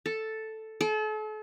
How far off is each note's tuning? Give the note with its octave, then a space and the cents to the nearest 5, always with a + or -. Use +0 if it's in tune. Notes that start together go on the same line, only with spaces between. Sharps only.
A4 +0
A4 -40